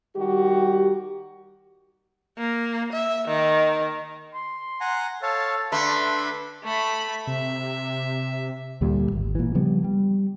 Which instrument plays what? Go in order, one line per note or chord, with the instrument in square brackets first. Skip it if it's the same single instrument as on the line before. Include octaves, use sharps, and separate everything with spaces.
[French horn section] D#3 G3 F#4 G4
[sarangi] A#3
E5
D#3
[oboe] C6
[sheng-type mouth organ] F#5 G#5 A#5
[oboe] A4 [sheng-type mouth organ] C#5 F5 A5
[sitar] D3 A3 [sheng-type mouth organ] B4 B5 [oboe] C6
[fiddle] A3 B5
[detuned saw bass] C3 [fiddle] E5
[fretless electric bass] D2 A#2 G3
G#1
A#2 E3
C#3 F3 G3 B3
G3